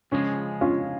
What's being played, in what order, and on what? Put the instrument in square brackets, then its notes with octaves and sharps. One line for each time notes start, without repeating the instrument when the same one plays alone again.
[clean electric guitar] C#2 C#3 F3 G#3 [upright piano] C#4
[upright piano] C#4 F4